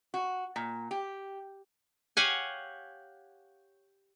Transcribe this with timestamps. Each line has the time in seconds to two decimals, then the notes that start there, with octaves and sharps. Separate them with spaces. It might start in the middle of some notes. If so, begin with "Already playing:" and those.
0.14 F#4
0.56 A#2
0.91 G4
2.17 G4 C#5 F5 F#5 G#5